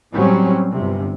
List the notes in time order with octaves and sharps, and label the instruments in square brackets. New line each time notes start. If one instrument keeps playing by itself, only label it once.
[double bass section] A2 F#3 G3 C4 C#4
G1 C3